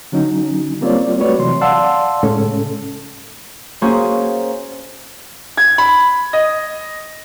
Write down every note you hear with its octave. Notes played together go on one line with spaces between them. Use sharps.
D3 F#3 C#4 D#4
G3 A#3 C4 F4 C#5 D5
G3 A3 F#4 B4 C#5 D5
C3 E3 F#3 C6
D5 F5 F#5 A5 C6 E6
A2 C#3 G#3 C#4 A4
A#3 C#4 F#4 G#4 C5
G#6
B5
D#5